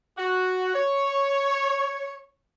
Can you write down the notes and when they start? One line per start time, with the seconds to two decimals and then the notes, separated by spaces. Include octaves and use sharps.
0.18 F#4
0.75 C#5